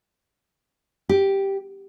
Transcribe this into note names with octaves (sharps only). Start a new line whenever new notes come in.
G4